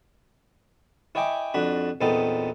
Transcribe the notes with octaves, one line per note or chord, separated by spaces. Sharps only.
E4 C#5 D#5 G5 G#5 D6
F2 D4 F#4 B5
E2 A#2 B3 C4 D#4 A4